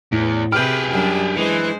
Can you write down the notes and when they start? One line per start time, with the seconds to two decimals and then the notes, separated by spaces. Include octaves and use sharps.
0.12 E2 A2
0.52 C3 G4 G#4 B4 F6 G6
0.90 F#2 G3 D4
1.36 E3 G#3 C5